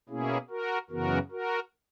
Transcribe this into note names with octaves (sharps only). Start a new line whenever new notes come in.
B2 A#3 C#4 E4 G#4
F#4 A#4
F#2 C#3 E3 B3 F#4 A#4
F#4 A#4